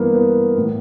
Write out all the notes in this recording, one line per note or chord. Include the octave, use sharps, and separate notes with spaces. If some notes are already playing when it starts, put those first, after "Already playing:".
Already playing: G2 E3 A#3 B3
B3
A2 E3